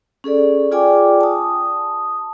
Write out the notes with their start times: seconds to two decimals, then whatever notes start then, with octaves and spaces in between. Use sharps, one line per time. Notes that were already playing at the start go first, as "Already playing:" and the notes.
0.24 C#4 G#4 A4 D5
0.71 F4 G#4 D5 G5 G#5 D6
1.21 A5 D#6